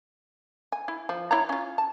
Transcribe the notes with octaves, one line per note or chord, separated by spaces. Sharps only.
G#5
E4
F3
E4 C#5 A#5
C#4 F4
A5